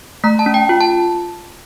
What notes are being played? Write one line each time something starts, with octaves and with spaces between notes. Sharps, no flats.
A3 A#5
A5
C#4
G5
F4
A5